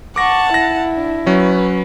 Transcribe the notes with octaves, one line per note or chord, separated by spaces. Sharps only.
F#5 A5 C#6 D6 A#6
E4 A#6
D4
F#3 C#4 B4